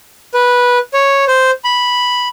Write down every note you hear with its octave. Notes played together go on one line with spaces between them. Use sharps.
B4
C#5
C5
B5